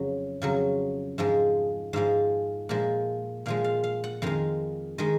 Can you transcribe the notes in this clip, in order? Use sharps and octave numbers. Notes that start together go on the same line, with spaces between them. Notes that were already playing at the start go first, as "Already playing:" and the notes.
Already playing: F2 C#3 F#3
F2 C#3 F#3
G#2 F3 G#3
G#2 F3 G#3 F5
A#2 F3 G#3
A#2 F3 G#3 F5
F5
F5
F#5
F2 D#3 G#3 F5
D#3 G#3 D#5